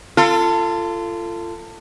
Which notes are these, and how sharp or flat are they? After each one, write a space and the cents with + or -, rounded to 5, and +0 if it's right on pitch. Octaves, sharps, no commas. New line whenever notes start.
F4 -25 A4 +20